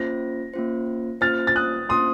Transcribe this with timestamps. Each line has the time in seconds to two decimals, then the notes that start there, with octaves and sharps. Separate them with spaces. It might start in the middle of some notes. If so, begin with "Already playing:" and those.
Already playing: A#3 C#4 F4 C5 A#6
0.54 A#3 C#4 F4 C5
1.21 A#3 C#4 F4 C5 F6 A6
1.47 A6
1.55 D#6 F#6
1.89 A#3 C#4 F4 C5 C6 D#6